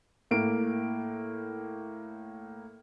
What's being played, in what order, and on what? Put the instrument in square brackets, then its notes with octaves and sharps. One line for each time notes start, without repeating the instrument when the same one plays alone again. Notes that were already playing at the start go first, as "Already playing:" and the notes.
[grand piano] A2 A#3 D7